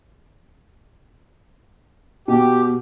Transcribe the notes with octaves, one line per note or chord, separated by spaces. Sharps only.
B2 G4